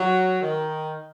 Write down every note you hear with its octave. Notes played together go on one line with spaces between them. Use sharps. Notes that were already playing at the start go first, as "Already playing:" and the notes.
Already playing: F#3
D#3